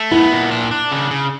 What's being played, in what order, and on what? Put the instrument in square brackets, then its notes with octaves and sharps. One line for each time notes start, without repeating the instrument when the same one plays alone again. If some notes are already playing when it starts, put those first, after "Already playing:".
Already playing: [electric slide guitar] A3
[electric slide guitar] B3 [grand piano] E4
[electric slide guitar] A#2
D4
D4
C#3
C#3